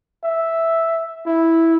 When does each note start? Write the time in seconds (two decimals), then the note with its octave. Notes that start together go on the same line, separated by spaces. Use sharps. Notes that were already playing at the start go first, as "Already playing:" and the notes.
0.23 E5
1.26 E4